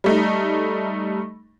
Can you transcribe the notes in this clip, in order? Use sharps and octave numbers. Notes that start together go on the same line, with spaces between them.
G3 A3 D#4